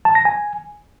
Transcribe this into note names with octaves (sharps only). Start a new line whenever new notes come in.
A5
A#6
G#5